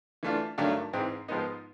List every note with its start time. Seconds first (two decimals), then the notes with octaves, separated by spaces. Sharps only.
0.23 E3 A3 D4 F4
0.58 G2 D#3 F#3 A3 D4
0.93 G#2 E3 G#3 C4
1.28 G#2 F3 G#3 B3 D#4